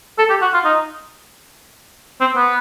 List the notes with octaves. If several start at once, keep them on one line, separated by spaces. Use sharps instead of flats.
A4
G4
F#4
F4
D#4
C4
B3